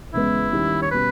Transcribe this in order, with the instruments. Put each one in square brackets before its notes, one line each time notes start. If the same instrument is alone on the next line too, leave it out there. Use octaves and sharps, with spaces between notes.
[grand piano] E2 C#3 G#3 B3 [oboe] E4
[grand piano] D#2 D#3 G3 C#4
[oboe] C#5
[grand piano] B2 G3 C#4 [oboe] B4